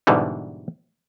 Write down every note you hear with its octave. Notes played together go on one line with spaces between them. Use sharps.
G#2 B2 D3 E3 G3